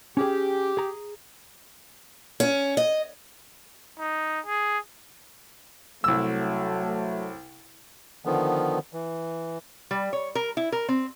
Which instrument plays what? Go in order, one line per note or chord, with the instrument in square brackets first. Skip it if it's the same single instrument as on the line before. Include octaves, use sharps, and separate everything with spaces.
[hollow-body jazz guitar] C#4 G#4 [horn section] G4
[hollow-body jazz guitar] G#4 A#5
[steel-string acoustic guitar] C#4
D#5
[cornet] D#4
G#4
[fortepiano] C2 E6 [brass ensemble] F#3 A3
[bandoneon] D3 D#3 F3 B3
E3
[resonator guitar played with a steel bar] G3
C#5
A#4
E4
A#4
C4